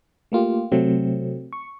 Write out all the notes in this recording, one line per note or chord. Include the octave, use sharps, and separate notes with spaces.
A3 A#3 F4 G4
C3 F#3 A3 C4
C#6